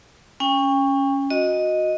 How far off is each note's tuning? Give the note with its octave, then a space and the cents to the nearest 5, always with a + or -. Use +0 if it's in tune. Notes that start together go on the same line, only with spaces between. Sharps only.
C#4 +0 G5 +35
F#4 -20 D#5 +0